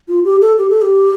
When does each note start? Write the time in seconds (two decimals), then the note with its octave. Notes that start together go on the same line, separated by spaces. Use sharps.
0.08 F4
0.25 G4
0.41 A4
0.58 G4
0.70 A4
0.82 G4